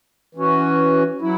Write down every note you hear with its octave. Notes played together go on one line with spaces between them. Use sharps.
E3 C#4 F#4
F#3 E4